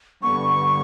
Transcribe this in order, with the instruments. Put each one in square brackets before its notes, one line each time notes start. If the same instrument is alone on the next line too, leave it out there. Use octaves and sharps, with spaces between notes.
[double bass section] G2 D3 G3 B3 [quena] C#6